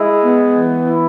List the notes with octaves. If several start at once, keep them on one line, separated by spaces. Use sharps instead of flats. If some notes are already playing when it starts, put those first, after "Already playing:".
Already playing: G#3 E4
B3
E3
E4